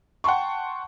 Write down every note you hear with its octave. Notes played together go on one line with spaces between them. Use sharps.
F#5 G5 A5 C6 C#6